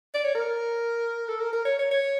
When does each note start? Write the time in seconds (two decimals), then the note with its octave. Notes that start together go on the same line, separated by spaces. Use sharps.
0.14 D5
0.24 C#5
0.35 A#4
1.28 A4
1.40 A#4
1.53 A#4
1.65 C#5
1.79 C#5
1.91 C#5